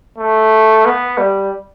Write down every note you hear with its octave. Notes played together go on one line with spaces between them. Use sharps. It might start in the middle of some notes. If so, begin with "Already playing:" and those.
A3
B3
G3